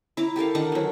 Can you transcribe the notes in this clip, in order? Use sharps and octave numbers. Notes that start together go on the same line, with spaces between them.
E4 A#5 D6
G4 A4 A#4 F5
D#3 D4 D#4 F#5
E3 F#3